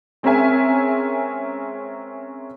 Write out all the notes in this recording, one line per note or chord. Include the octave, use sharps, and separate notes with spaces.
G#3 C4 C#4 A#4 E5 G#5